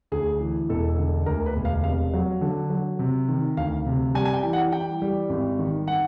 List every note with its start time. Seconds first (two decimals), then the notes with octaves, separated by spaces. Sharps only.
0.12 D2 G#4
0.41 E3
0.69 E1 A4
0.98 D3
1.26 D2 A#4
1.46 B4
1.56 E1
1.65 F5
1.84 F1 F5
2.13 F#3
2.41 D3
2.70 F#3
2.99 C3
3.28 D#3
3.57 D2 F5
3.86 C3
4.15 G3 G#5
4.25 G#5
4.33 G5
4.44 E3
4.53 F#5
4.72 E3 G5
5.02 G3
5.29 G#1
5.59 D#3
5.88 F#5